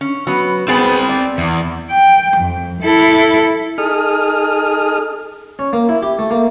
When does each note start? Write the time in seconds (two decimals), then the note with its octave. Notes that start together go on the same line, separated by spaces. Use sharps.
0.01 C#4
0.27 F#3 B3
0.68 B3 C4 G#4 C5 B5
1.09 D5
1.38 E2
1.91 G5
2.37 F2
2.82 E4 A4
3.78 D#4 G#4 A4 D#6 F6
5.59 C#4
5.73 A#3
5.89 E4
6.03 G4
6.19 A3
6.31 A#3